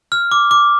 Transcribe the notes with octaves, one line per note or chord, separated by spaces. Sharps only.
F6
D6
D6